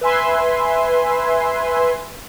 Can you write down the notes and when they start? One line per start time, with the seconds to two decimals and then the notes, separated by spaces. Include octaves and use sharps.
0.01 B4 E5 G#5 C6